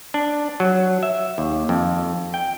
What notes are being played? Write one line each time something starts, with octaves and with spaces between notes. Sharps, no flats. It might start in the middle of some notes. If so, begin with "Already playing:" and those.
D4
F#3
E5
D#2
F2
G5